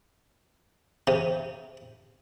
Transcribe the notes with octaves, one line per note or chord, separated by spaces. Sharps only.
C3